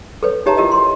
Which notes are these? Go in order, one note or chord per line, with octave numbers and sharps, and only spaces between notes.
A4 B4 C#5
D#4 G4 C#5 E5 A5 A#5
E4 F4 G4 A#4 C#5 D#5
C6